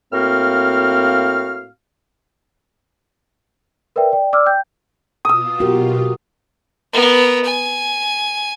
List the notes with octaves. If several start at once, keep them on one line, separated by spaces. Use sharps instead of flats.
A2 A#3 C4 F#4 F5 F6
A#4 B4 D5 E5 G5
D5 G5
D5 D6 E6 F6
G5 G6
B2 F4 D#6 E6
F#4 G4 A#4
B3 A#4
G#5